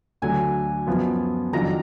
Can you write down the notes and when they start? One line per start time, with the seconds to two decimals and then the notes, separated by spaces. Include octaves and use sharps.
0.22 D2 D3 F#3 G#5
0.87 F#2 F3 B3 F4
1.53 F2 D#3 F#3 D4 F4 A#5